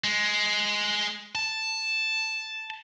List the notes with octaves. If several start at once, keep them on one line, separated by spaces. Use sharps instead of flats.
G#3
A5